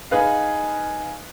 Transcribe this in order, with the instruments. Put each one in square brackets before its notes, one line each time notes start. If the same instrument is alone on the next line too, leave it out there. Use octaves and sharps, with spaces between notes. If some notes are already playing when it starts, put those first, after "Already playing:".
[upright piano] D#4 G#4 B4 F5